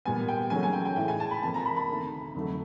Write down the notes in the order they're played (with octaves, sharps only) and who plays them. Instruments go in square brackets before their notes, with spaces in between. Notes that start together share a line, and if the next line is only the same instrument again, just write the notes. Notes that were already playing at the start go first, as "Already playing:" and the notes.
[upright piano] A#2 G3 B3 G#5
G5
C#3 F#3 A3 C#4 G#5
G#5
G5
G5
A2 E3 G#3 G5
G#5
A5
B5
C3 F3 A#3 A5
A#5
B5
B5
D2 C3 D#3
F2 D3 F#3 A3